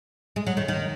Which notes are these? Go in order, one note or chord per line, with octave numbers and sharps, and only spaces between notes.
G#3
F#3
D#3
D#3